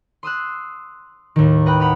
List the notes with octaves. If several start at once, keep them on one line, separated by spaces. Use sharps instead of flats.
C6 D#6 E6 F#6
D#2 A2 D#3
B4 D#5 G5 B5 F#6
F#5 B5 D#6 F6